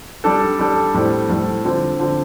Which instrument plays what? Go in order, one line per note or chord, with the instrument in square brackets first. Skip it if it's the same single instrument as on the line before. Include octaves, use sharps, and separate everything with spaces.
[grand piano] G3 D4 A4
G3 D4 A4
A2 G3 C4 A4
A2 G3 C4 A4
D3 F3 C4
D3 F3 C4